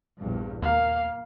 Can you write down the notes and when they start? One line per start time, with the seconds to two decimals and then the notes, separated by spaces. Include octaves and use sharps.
0.19 A#1 E2 G2
0.62 D#2 A#3 F5